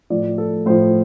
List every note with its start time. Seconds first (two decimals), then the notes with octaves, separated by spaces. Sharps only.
0.10 A2 F3 D5
0.38 A4
0.66 A2 F3 C5